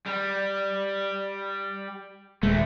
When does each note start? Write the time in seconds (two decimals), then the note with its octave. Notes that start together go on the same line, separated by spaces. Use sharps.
0.06 G3
2.43 D#1 D2 G#3 A3